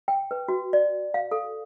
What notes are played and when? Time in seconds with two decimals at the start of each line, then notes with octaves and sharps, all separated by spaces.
0.08 G5
0.31 B4
0.48 F#4
0.73 D5
1.14 F5
1.31 A4